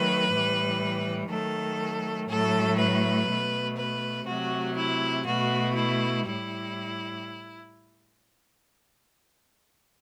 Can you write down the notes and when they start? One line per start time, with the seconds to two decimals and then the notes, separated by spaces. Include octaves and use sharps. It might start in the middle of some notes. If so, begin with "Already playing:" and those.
Already playing: D#3 F#3 A3 B4
0.31 A2 E3 G3
1.30 D#3 F#3 A3 A4
2.29 A2 F#3 A3 A4
2.79 B4
3.28 B2 A3
3.77 B4
4.27 C3 F#3 A3 F#4
4.76 E4
5.26 B2 A3 F#4
5.75 E4
6.25 A2 G3 E4